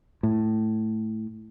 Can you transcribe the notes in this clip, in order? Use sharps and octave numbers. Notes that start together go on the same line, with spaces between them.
A2